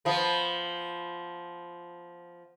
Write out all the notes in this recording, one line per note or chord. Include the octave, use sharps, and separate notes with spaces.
F3 B3